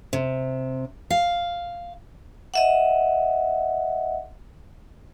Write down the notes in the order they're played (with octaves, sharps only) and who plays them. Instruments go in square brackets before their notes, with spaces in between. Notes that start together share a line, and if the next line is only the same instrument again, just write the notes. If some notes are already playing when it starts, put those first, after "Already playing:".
[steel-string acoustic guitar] C3
F5
[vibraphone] D#5 E5 F#5